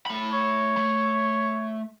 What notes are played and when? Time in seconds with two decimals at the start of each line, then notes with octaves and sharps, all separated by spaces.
0.06 A3 B5
0.33 C#5
0.77 A3